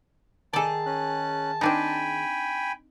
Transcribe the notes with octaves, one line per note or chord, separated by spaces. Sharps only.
D#3 G#4 A4 D5 A5
C#4 F#6
C4 D4 D#4 G5 G#5 B5